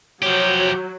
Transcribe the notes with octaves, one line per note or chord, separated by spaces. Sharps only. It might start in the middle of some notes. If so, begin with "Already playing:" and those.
F3 F#3 G4 C#5 G6